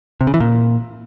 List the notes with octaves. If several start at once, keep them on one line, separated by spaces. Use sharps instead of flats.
C3
C#3
E3
A#2